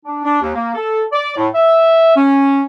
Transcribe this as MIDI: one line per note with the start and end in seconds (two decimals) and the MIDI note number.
0.05 0.21 62
0.24 0.40 62
0.42 0.52 39
0.55 0.74 58
0.74 1.02 69
1.12 1.34 74
1.37 1.48 45
1.55 2.16 76
2.16 2.63 61